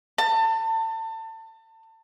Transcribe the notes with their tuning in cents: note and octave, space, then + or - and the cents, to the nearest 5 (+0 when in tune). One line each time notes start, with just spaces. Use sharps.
A5 +30